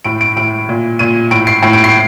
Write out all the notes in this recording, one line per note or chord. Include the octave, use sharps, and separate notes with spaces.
A2 D7
D7
A2 D7
A#2
A#2 D#7
A2 D7
C7
A2 D7
D7
C7